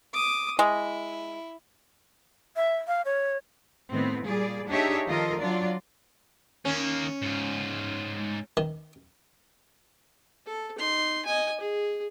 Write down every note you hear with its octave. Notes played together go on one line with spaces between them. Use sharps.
D6 D#6
G#3 E4
E5
F5
C#5
A2 D#3 B3 C4
A#2 G3 G#4 D5
D4 D#4 G4 G#4 C#5 E5
D#3 F3 F4 A4 A#4 D#5
F#3 D4 F4 D5
D#3 A#3 C#4
G#2 F4
D#3
A4
D#4 C6
D#5 G#5
G#4